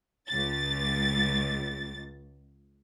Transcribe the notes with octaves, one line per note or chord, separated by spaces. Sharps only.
C#2 A6